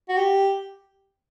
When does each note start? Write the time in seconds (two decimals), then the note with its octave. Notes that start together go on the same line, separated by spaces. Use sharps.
0.09 F#4
0.17 G4